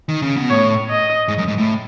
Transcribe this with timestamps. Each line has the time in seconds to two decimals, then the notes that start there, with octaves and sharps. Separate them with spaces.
0.09 D#3
0.22 C#3
0.36 B2
0.50 A2 C#5
0.90 D#5
1.28 G#2
1.38 F#2
1.48 G#2
1.58 A2